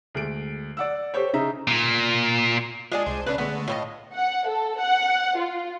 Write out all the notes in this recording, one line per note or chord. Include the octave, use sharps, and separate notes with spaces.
D2 G#3 D7
D5 F#5 E6
G4 A4 C5 C#5
C#3 D#4 E5 A#5
A#2
G#3 D4 F4 G#4 D#6
C2 C5
C#3 A3 C#4 D4 B4
D3 G#3 A3 B3
A2 E4 F4 D#5
F#5
A4
F#5
F4